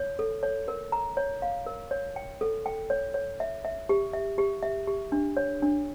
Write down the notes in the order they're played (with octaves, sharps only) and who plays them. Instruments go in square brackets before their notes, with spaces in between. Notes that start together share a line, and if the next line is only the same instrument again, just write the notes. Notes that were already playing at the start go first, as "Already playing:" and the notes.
Already playing: [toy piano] C#5
A4
C#5
A#4
A#5
C#5
F5
A#4
C#5
G5
A4
G5
C#5
C#5
E5
E5
G4
E5
G4
E5
G4
D4
C#5
D4